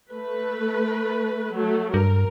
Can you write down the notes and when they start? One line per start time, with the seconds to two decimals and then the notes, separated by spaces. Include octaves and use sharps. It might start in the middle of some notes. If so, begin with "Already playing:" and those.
0.11 A3 B4
1.54 F#3 A3
1.94 G2 A#4